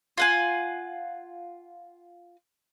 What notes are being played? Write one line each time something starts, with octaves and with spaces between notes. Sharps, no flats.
F4 F#5 G#5